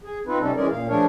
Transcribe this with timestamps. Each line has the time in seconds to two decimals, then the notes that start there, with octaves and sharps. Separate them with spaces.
0.04 G#4
0.27 C4 D#4 F4 B4
0.40 C3 G3 C#4 D#4 A4
0.56 E3 G#3 C#4 G#4 A#4 D5
0.71 A#2 F5
0.88 F3 A3 D4 G#4 A#4 C#5